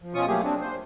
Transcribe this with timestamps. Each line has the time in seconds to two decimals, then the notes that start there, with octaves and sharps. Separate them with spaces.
0.02 F3
0.14 B2 C#4 F4 C#6 D#6
0.27 F#3 A3 A#3 G4 G#4
0.44 C4 D4
0.61 C5